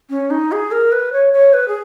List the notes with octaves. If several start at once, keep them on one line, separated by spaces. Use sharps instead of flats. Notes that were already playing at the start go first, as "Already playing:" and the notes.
C#4
D#4
G#4
A#4
B4
C#5
C#5
B4
G#4